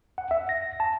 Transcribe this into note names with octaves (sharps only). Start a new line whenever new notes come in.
F#5
E5
A#6
A5